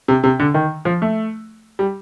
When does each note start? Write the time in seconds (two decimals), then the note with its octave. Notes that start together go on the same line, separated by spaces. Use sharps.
0.08 C3
0.24 C3
0.40 D3
0.54 D#3
0.85 F3
1.02 A3
1.79 G3